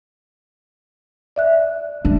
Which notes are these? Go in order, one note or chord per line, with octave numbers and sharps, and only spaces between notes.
D5 E5 F#6
D4